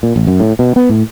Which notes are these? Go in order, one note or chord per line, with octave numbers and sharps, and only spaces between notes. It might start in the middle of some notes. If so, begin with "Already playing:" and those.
A#2
A1
F#2
A2
B2
B3
A2